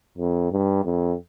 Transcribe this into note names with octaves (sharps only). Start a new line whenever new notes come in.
F2
G2
F2